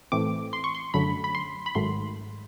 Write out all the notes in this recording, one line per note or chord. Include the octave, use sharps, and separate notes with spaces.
A2 E3 A3 C4 D6
C6
C#6
C6
F#2 D3 F#3 A3 B5
B5
C6
B5
G#1 G#2 D#3 F#3 A3 C6